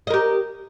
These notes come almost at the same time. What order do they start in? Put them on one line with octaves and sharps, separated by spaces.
D#5 A#4 G4